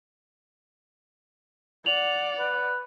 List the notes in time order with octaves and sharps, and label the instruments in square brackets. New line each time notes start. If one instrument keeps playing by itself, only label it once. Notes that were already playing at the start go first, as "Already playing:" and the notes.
[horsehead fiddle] D5 F#5 [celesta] F7 F#7
[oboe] B4